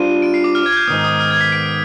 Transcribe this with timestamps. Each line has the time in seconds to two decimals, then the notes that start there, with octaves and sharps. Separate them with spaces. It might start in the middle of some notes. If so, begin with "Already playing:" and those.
Already playing: G3 D4 F4 C5 D#7
0.22 D7
0.34 C7
0.44 D6
0.55 F6
0.66 G#6
0.72 F6
0.77 G6
0.87 G#2 D#3 B3 D#6
1.04 D#6
1.20 F6
1.31 G#6
1.41 B6
1.52 D7
1.63 D7